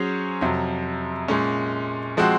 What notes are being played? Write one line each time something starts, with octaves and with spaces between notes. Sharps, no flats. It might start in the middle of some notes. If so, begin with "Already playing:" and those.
Already playing: F#3 C#4 G#4 C5
F2 C3 F#3
A#2 G#3 C#4
F3 G#3 C4 F#4